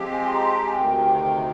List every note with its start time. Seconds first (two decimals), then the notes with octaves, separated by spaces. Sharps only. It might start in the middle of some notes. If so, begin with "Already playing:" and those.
Already playing: F3 G#3 C4 G4
0.12 G#5
0.26 C6
0.33 A#5
0.43 C6
0.54 A#5
0.66 G#5
0.75 D2 C3 D#3 G5